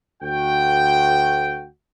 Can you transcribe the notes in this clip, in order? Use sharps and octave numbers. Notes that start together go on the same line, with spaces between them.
D2 F#4 G5